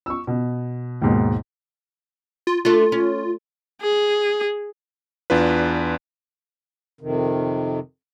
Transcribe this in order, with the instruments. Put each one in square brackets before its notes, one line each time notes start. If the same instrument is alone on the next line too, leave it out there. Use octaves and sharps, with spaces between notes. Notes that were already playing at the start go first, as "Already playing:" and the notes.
[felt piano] C#6 E6
B2
D#2 G#2 B2
[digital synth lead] F4
[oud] A3 D4 A4 [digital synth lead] F4
[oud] C#4
[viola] G#4
[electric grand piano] E2 D4 F4 B4
[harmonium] F2 C3 D#3